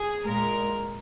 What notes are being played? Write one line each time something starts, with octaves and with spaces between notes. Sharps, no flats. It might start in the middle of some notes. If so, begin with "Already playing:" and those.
Already playing: G#4
A#2 G#3 A#4